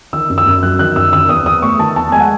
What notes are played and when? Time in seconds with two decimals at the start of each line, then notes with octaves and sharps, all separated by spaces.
0.13 D#3 E6
0.29 F#2
0.38 E6
0.46 F#2
0.63 F#3 F#6
0.79 D#3 F#6
0.96 F#2 E6
1.13 D#3 E6
1.29 E2 D#6
1.46 E2 D#6
1.62 A3 C#6
1.79 D#3 A5
1.95 E2 A5
2.12 G#3 G#5
2.20 F#5